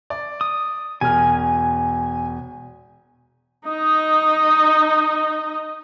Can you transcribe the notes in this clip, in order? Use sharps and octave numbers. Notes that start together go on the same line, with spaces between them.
D5
D#6
E1 G#5 F6
D#4 D#5